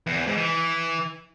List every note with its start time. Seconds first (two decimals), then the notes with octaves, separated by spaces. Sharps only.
0.07 E2
0.17 E2
0.27 G#2
0.37 E3